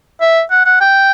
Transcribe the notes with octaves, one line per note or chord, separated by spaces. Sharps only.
E5
F#5
F#5
G5